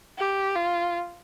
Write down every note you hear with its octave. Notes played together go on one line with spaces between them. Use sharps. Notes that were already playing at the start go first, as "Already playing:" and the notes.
G4
F4